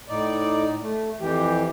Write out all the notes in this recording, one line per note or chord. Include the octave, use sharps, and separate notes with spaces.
A2 D#4 D5
A3
F2 E3 G4